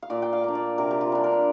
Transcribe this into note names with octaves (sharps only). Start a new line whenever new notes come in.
F5
A#2 D5
G5
F5
A#3 D4
D5
C3 A#4
G4
F4
G3 D4
A#4